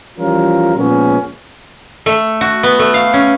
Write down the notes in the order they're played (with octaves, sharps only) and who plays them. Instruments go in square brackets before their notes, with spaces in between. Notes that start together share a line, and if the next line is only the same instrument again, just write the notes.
[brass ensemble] E3 F3 G3 C#4 F4 A#4
A#2 F3 G#3 B3 C#4
[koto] A3
F#4
B3
A3
F5
C#4